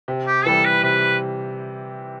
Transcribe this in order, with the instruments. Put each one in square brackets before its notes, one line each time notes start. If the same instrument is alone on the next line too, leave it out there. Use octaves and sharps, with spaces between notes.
[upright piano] C3
[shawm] G4
[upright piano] E3 G3 [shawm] A4
[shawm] B4
[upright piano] C3 [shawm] B4